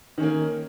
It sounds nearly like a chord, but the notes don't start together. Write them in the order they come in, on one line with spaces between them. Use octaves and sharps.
D#3 C#4 A#3